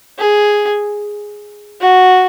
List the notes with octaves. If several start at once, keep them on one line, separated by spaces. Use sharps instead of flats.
G#4
F#4